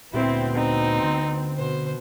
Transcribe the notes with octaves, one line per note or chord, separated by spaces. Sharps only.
D2 A#2 B3 C4 E4
C4 D#4
D3
B2 C5